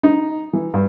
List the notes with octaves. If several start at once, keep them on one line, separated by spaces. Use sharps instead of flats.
D#4
E3
G2